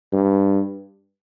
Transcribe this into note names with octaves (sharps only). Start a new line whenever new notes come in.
G2